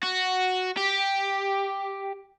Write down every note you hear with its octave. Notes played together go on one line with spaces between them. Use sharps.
F#4
G4